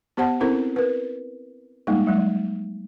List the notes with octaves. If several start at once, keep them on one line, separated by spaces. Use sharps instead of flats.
B3 G4 C5 F#5 A5
C4 C#4 E4 A4 A#4 C5
A#4 B4
G3 G#3 A#3 D#4
F#3 G#3